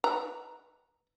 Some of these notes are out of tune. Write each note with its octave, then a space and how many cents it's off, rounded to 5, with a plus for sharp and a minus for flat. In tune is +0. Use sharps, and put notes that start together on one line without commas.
D#4 +15 B4 +0 A#5 +0